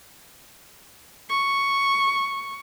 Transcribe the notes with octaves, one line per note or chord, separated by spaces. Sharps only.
C#6